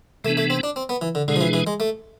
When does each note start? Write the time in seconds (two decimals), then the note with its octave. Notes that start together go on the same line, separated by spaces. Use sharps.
0.24 C3 E3 A3 B3 D4
0.37 A3
0.50 C4
0.63 D4
0.76 C4
0.89 B3
1.01 E3
1.15 D3
1.28 B2 D3 G#3 D4 G#4
1.36 F3
1.41 E3
1.53 E3
1.67 G#3
1.80 A3